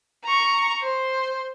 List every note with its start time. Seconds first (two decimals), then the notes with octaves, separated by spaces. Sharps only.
0.24 A#5 C#6
0.81 C5